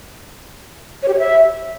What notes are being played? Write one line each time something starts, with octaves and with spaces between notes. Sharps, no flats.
C#5
G4
C#5
E5